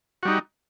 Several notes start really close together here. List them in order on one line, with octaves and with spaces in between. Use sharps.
F#4 G3 D#4